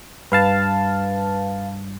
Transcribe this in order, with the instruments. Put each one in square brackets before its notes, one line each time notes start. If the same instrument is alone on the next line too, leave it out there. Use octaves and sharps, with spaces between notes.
[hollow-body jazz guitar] G2 [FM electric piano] B4 F5 A5